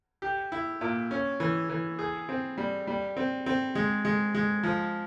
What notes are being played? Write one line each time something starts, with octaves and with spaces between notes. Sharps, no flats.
G4
E4
A#2
C#4
E3
E3
G#4
C4
G3
G3
C4
C4
G#3
G#3
G#3
F3